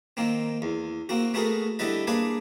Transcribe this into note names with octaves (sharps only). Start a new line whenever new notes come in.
D#3 A#3 C4
E2
A#3 C4 F#4
A3 B3 F#4 G#4 A#4
D3 G3 B3 E4 B4 D#5
A#3 D4 G#4 B4 G#5